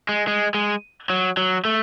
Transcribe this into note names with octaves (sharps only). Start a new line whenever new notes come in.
G#3
G#3
G#3
F#3
F#3
A3